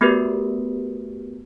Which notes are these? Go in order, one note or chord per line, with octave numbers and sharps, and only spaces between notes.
A3 B3 F#4 G4 A#4 B4